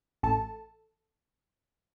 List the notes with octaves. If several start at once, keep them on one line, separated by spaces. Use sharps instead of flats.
A1 A4 A5